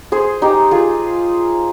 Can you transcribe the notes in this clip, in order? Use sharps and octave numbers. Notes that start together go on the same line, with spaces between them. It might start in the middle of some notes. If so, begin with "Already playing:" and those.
G#4 C5
D#4 G4
F4 G#4